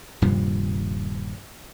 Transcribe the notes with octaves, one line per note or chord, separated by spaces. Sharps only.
D#1 G2 C3 F3